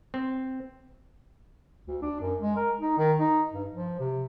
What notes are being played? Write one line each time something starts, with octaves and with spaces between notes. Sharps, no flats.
C4
D2
D4
F#2
G#3
A#4
D#4
D#3
D#4
G2
F3
C3